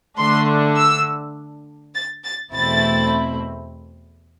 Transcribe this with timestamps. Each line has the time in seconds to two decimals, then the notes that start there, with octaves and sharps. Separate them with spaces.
0.18 D3 A3 D4 C6
0.77 E6
1.94 A6
2.24 A6
2.53 E2 B2 A3 C4 E4 A6